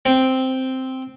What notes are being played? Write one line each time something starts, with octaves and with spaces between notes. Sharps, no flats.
C4